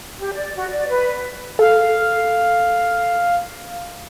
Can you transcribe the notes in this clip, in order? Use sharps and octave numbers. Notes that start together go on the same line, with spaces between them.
G4
D5
F#4
D5
B4
A4 F5